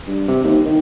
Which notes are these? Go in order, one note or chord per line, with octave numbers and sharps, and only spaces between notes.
G2
C3
D#2
D#3